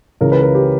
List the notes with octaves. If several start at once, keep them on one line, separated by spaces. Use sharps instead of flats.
C#2 C#3 E3 A#4
B4
A#4
G4